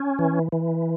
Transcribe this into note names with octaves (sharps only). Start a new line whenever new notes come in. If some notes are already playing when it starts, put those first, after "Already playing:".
Already playing: C#4
E3
E3